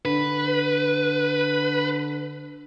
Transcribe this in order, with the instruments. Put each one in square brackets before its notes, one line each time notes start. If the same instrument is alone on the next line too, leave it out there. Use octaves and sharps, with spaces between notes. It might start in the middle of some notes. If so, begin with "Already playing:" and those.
[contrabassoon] D3 [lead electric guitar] B4